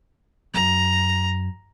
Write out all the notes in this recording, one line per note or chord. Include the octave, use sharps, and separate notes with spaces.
F#2 A#5